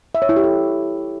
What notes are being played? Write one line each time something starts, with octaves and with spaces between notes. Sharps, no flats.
E5
C#5
E4
G4
A4